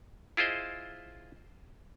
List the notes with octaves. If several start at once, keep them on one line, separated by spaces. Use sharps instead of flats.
E4 F4 G#4 C5 D#5